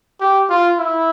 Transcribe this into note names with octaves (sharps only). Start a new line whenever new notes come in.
G4
F4
E4